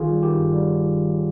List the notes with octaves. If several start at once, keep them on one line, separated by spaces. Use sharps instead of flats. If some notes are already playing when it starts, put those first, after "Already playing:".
Already playing: G1 D#3 F4 G#4
G3
D#3 G4
G2
G3